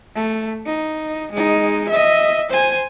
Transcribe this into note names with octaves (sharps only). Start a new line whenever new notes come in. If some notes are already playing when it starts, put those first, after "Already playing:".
A3
D#4
G#3 D#4
D#5 E5
C5 G#5